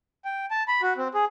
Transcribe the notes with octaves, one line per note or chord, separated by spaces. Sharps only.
G5
A5
B5
F#4
C4
G#4